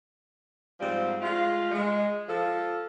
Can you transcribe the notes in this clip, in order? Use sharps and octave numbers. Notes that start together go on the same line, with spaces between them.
G#2 F3 G3 C4
G#3 A3 F4
G#3
F3 A4